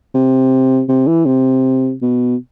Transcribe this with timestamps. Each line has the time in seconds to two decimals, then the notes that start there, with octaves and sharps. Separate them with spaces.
0.14 C3
0.89 C3
1.07 E3
1.26 C3
2.02 B2